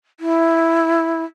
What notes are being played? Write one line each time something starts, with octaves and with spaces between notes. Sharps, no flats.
E4